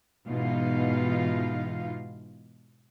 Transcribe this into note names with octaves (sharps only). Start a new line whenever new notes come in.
G#2 B2 E3 D#4 F4 F5